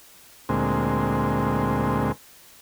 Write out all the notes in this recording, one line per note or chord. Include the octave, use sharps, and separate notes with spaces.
D2 A#2 G#3 C4